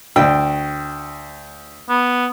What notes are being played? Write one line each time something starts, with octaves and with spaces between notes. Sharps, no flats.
D2 G5
B3